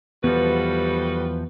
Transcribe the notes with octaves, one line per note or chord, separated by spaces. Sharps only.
E2 F3 G3 B3 F#4 A4 B4